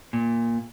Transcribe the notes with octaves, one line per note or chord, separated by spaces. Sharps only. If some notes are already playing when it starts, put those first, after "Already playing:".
A#2